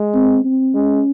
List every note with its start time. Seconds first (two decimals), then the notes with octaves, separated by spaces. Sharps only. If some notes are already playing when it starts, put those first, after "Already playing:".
Already playing: G#3
0.14 C4
0.45 C4
0.74 G#3 C#4